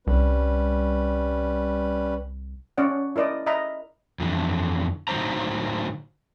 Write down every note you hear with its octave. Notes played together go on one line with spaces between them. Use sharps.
C2 G3 C#4 B4
C#4 C#5 D5 F#5
E4 A#4 D5 D#5 D#6
D#5 E5 A#5 B5
F2 D3 E3
A2 D3 F#3 D#4 C5 A#5